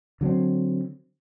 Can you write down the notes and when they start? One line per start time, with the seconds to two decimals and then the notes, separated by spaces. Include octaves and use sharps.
0.21 D3 F#3 G3 C4